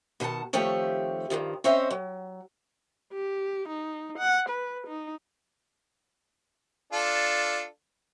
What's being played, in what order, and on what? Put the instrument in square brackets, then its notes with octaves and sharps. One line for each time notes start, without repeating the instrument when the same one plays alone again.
[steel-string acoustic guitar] B2 D#3 A#4 F#5 A5
D#3 F3 A3 C4 G4 C#5
G2 A#2 D#3 F3
C4 C#4 C5 C#5 D#5 E5
F#3
[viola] G4
D#4
F#5
B4
D#4
[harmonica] D4 F4 A4